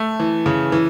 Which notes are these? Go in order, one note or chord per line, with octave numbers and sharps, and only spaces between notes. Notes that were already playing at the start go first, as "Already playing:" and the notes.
Already playing: A3
E3
C#3
E3